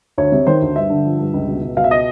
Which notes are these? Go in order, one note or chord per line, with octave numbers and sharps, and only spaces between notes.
D2 C#5
C3
D#3 C5
D2
G2 E5
D3
F3
G2
C#2
B2
C#2
B2 F5
E5
D#5